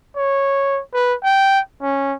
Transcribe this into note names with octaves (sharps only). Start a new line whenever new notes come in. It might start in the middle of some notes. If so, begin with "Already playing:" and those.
C#5
B4
G5
C#4